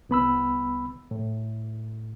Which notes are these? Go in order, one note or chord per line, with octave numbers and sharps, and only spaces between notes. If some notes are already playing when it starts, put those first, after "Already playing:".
C2 B3 B5 E6
A2